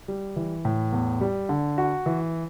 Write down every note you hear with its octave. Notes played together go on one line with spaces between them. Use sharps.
G3
E3
A2
E2
G3
D3
F#4
E3